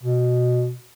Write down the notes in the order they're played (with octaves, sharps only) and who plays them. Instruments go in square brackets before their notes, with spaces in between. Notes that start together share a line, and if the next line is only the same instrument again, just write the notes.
[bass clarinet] B2